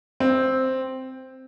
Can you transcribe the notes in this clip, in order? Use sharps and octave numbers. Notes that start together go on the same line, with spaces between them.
C4